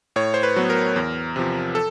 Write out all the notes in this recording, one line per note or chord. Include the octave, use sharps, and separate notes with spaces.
A2 C#5
C5
B4
F#3 B3
A#4
E2
C3 F3
A4